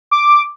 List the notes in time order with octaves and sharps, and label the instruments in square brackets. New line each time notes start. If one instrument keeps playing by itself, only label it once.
[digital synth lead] D6